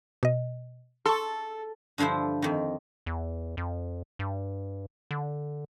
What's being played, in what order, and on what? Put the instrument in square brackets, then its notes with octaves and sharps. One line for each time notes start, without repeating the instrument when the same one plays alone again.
[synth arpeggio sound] B2 D#5
[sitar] A4 [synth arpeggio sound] C6 C#6
[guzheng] G2 D3 F3 E4 C5
F2 D#3
[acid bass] E2
F2
G2
D3